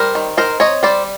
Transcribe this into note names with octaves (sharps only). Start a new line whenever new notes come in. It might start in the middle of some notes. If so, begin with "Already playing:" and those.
Already playing: G3 A#4 C5
D#3
D#4 A#4 C5
C4 C#5 D#5
G3 C5 D5